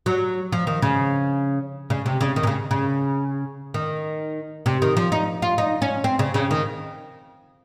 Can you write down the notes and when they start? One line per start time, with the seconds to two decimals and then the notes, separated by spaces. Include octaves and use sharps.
0.06 F#3
0.52 F3
0.67 D#3
0.82 C#3
1.90 C#3
2.06 C3
2.21 C#3
2.36 D#3
2.43 C3
2.47 C#3
2.71 C#3
3.74 D#3
4.66 C3
4.82 D#3
4.97 F3
5.12 D#4
5.42 F4
5.58 D#4
5.82 C#4
6.04 C4
6.19 C#3
6.34 C#3
6.51 D#3